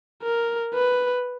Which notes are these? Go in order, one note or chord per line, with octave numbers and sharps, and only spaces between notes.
A#4
B4